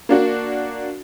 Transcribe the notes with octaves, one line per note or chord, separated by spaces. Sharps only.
A#3 D4 F#4